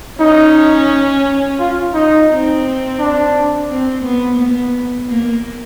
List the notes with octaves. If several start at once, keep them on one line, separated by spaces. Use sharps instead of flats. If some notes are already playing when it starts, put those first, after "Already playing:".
C#4 D#4
F4
D#4
C4
D4
C4
B3
B3
A#3